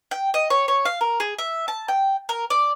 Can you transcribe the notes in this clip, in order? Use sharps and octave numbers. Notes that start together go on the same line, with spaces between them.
G5
D#5
C#5
C#5
F5
A#4
G#4
E5
A5
G5
A#4
D5